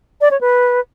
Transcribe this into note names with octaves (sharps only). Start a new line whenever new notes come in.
D5
C#5
B4